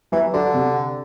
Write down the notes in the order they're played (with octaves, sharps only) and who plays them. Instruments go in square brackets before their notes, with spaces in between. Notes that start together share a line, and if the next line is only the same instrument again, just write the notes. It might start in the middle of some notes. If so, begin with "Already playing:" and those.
[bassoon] E3 [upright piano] F#3
[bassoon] D3 [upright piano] F#4
[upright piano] C3